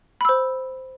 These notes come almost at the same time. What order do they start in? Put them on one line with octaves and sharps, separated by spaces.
B5 E6 C5